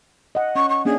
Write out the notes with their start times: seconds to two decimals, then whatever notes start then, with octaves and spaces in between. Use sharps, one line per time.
0.35 D#5 F#5
0.55 C#4 C#6
0.69 C#6
0.85 A#3 C#4 D4 G#4